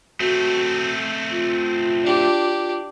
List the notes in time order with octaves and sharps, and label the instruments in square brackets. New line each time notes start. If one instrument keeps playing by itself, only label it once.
[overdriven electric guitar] A3 C4 [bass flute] F#4
[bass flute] F4
[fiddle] D4 G4